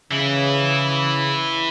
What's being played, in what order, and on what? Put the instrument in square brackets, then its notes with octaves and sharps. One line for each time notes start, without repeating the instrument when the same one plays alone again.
[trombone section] C#3 [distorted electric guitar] E3 E4